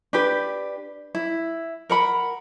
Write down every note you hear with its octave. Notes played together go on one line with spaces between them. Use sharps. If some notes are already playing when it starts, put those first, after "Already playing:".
D4 G4 B4
E4
A#4 F#5 B5